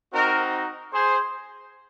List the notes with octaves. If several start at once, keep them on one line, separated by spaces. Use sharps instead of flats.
C4 D#4 F#4 A#4
G#4 C5